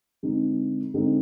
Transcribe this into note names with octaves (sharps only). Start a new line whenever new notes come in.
D3 G#3 C4 D#4
D3 G#3 C4 D#4